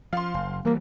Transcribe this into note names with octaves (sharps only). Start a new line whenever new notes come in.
F3 F5 C6
F#1
E3 G3 A#3